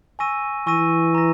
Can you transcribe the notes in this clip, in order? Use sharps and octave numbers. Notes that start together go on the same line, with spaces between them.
G#5 C#6 E6 A#6 D#7
E3 G#5 C#6 E6 A#6 D#7
A#5 E6 A#6